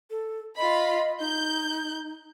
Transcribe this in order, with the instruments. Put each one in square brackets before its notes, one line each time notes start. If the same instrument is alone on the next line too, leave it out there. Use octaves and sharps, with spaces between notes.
[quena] A4
[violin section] F4 B5 [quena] D#5
[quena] D#4 [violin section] G6